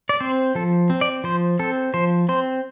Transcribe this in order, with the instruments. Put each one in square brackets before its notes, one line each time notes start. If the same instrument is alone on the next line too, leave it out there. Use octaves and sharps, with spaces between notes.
[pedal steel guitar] D5
C4 C5
F3 A4
C4
D5
F3 C5
C4 A4
F3 C5
C4 C5